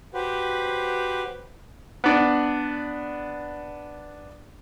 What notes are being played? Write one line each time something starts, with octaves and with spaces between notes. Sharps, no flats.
F#4 G4 B4 C5
B3 D4